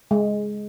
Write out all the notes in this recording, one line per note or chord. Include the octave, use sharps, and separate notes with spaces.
G#3